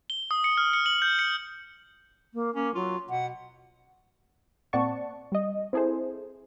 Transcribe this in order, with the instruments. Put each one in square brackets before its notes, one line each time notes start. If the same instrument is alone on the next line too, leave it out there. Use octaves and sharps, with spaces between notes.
[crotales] G7
D#6
C#7
F6
C#7
F#7
G6
C#7
[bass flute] A#3
[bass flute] A#3 [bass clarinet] C#4
[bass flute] F#3 [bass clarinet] F4
[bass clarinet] B2 [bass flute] F#5
[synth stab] A#2 C4 D5 F#5 A5 C#6
G3 D#5
C4 E4 G#4 A4 C5